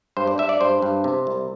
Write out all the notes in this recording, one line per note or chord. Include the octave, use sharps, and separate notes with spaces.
G2 C5
D5
G2 E5
D5
G2 C5
G2
C3
C2